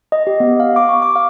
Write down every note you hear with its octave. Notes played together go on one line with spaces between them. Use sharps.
D#5
G4
B3
F5
D6
C#6
D6
F5